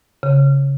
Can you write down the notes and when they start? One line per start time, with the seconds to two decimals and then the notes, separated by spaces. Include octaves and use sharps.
0.23 C#3